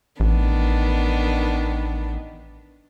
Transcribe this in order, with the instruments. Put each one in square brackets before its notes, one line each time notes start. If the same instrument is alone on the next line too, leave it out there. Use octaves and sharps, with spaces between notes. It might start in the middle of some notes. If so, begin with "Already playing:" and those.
[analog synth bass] A1 [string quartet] D#3 B3 D4